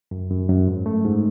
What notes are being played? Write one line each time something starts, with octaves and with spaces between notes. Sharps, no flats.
F#2
F#2
F#2
G#2
A3
G#2